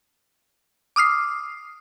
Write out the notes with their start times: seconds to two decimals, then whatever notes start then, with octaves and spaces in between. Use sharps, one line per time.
0.96 D6 D#6 F6 C7